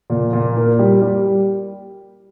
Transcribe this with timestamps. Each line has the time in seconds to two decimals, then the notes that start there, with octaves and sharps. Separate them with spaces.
0.10 A#2
0.33 A#2
0.56 A#3
0.79 G3
1.02 G3